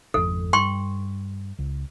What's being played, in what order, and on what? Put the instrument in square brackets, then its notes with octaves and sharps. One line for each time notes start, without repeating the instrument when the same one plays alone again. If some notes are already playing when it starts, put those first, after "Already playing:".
[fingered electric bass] G#1 F2 [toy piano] A4
[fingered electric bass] G2 [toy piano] G5 C6 C#6
[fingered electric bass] C#2